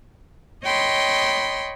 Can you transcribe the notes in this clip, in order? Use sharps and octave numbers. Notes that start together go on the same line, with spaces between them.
C#5 D#5 G5 B5 C6